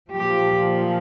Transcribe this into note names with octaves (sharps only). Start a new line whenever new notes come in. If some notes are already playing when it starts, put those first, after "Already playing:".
A#2 F3 G4